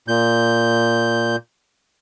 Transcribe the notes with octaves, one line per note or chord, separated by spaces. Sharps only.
A#2 G6